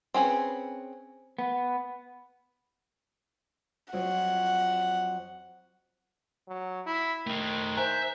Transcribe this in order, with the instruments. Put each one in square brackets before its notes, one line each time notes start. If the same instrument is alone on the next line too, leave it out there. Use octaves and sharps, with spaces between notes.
[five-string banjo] C4 C#4 G#4 B4
[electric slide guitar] B3
[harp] F2 F#3 C#5 [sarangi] F#5
[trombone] F#3
E4
[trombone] D#3 [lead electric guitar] A3 D#4
[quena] C5 [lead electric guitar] E5 [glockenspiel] G#5 A#5 F#6